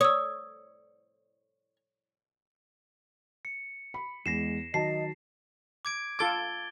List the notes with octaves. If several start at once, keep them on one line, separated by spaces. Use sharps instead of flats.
C#5 D#6 E6
C#7
B5
E2 G#3 A#6 C7 E7
D#3 F#3 D#5 A5 C7
D6 G#6 D7
F4 A4 D6 G#6 A6 G7